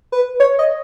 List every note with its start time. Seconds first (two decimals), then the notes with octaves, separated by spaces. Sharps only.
0.12 B4
0.40 C#5
0.59 D#5